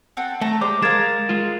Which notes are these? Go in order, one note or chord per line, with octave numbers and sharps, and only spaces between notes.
C4 A4 F#5
A3 A5 A#5
G#3 G4 C5 D5 D6
G#3 A#4 F5 G#6 A6 E7
G#3 F4